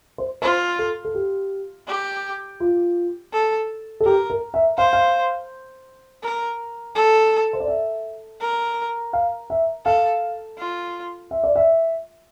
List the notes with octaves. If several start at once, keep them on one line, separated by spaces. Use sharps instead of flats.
C5
F4 C5
A4
A4
G4
G4
F4
A4
A4
G4 A#4
A#4
E5
C5 F5
F5
A#4
A4
C5
D5
E5
A#4
F5
E5
A4 F5
F4
E5
D5
E5